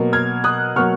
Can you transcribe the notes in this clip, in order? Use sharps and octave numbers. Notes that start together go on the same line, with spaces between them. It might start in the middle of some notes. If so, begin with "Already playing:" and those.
Already playing: B2 F#3 A#3
F6 G#6
D#6 F#6
B2 F#3 A#3 C#6 F6